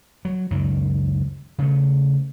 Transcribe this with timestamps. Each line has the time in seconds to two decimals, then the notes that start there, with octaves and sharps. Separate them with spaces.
0.25 F#3
0.51 C#2 F#2 D#3
1.58 C#3 A3